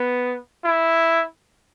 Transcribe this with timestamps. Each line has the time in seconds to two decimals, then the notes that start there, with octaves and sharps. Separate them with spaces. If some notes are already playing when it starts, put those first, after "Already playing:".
Already playing: B3
0.64 E4